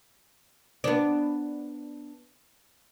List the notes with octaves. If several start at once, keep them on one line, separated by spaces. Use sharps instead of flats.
B3 D4